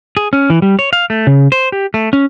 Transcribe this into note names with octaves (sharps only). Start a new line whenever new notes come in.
G#4
C#4
E3
G3
C#5
F5
A3
C#3
C5
G4
A3
C#4